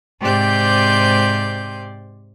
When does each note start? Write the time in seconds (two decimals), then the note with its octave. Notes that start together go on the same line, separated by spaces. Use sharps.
0.22 G#2 C3 G4 D5 C6 G6